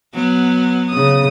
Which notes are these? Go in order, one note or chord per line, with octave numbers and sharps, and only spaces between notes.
F#3 B3
C#3 D#6